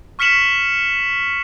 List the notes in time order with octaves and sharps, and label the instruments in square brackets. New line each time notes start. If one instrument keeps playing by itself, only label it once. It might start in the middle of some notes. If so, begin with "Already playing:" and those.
[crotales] C#6 F6 B6 C#7 E7 F#7